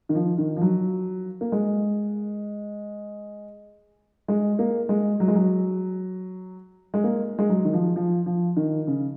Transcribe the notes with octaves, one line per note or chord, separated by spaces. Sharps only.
D#3
F3
D#3
F3
F#3
A#3
G#3
G#3
A#3
G#3
F#3
G#3
F#3
G#3
A#3
G#3
F#3
D#3
F3
F3
F3
D#3
C#3